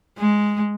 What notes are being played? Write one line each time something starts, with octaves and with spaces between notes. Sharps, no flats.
G#3